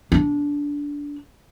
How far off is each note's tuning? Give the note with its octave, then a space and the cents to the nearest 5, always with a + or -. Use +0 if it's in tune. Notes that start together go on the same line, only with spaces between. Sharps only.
D4 -20